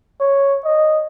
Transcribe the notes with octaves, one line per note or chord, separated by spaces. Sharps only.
C#5
D#5